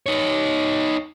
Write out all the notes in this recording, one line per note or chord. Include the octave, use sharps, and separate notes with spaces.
D#4 C#5